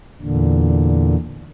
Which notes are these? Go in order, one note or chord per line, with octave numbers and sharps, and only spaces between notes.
E2 A#2 D3